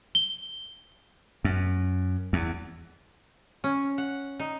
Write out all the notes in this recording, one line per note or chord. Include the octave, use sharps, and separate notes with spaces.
G7
F#2
E2
C#4
F#5
D#4